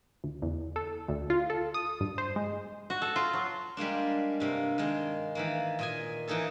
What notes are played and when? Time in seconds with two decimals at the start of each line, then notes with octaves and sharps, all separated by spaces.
0.24 D2
0.42 E2
0.76 A4
1.08 D2
1.30 F4
1.50 A4
1.74 D#6
2.01 G2
2.18 C5
2.36 G#3
2.90 F#4
3.02 A4
3.16 F4
3.33 F#3
3.77 G3 G#3 A#3 D4
4.40 G2 C3 A#3
4.78 D#3 G#3 A#3
5.35 D#3 E3 A#3
5.79 A#2 D#5 G#5
6.27 E3 A#3 D#4 G#4 A4